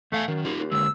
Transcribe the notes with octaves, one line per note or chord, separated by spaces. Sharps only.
E2 A3 F5 G#5
F#2 D#3
D#4 F4 G4
D#2
D3 G#3 E6